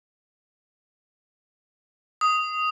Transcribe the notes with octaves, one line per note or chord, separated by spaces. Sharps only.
D#6